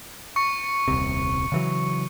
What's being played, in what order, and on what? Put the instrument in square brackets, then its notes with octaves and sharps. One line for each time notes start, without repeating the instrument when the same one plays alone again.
[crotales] C#6 C#7
[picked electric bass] D#1 C2 C3
C#3 E3 F#3